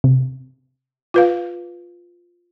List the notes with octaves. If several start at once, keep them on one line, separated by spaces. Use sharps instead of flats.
C3
F4 B4 F5